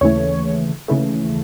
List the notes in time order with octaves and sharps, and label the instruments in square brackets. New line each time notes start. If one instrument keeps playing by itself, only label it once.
[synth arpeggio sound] D#2 C#3 E3 A3 C#5
D#2 C#3 E3 A3